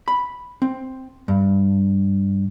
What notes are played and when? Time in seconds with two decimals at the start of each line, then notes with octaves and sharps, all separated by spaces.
0.08 B5
0.62 C4
1.28 G2